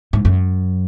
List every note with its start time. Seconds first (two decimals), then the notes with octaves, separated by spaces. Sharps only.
0.13 G#2
0.25 F#2